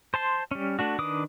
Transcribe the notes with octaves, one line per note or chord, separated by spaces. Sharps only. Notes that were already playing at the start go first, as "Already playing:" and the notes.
C5 A5 C6
G3 C#4
A3 D4 F#4
D#3 D4 B4 D6 D#6